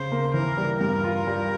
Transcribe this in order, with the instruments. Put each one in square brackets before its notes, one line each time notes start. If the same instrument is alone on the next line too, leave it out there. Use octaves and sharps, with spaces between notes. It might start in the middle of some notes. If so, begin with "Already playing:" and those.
Already playing: [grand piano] C#3 [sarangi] C5
[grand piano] A#3
[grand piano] E3 [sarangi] A#4
[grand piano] G3
[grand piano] G2 [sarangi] A#4
[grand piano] F4
G3